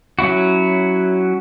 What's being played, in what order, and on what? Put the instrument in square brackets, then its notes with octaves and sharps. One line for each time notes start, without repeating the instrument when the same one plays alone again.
[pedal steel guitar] F#3 C#4 E4 F#4